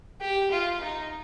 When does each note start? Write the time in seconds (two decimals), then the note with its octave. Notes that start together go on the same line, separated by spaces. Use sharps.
0.21 G4
0.51 F4
0.81 D#4